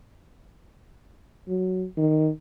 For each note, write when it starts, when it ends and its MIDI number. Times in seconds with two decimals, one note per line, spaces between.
1.49 1.85 54
1.97 2.29 51